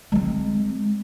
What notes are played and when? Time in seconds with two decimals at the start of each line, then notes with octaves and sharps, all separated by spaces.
0.12 G#3 C4